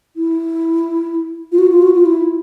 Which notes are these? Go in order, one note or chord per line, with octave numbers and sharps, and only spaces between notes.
E4
F4
F#4
F4
F#4
F4
E4